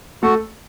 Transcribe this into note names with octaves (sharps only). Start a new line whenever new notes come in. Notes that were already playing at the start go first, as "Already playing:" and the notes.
A3 F#4 A4